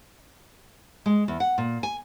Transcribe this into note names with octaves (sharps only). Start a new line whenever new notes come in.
G#3
E2
F#5
A#2
G#5